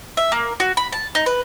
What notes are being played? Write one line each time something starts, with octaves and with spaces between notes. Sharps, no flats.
E5
A#3
F#4
B5
A5
D#4
B4